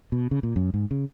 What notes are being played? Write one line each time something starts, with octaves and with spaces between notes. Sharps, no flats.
B2
C#3
A#2
F#2
G#2
C#3